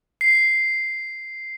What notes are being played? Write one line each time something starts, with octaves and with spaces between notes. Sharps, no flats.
C7